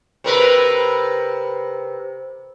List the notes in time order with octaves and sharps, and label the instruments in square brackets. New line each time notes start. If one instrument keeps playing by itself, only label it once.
[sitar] C3 A#4 B4